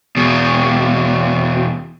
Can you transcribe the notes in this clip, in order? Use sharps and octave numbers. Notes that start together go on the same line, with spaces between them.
E2 B2